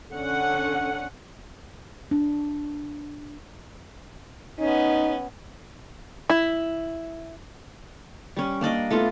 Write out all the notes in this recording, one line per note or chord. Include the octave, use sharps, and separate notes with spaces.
D3 C#4 F#5
D4
B3 C#4 D#4
E4
G3 C#4
A#3 D4 D5 D#5
A3 B3 F4 A4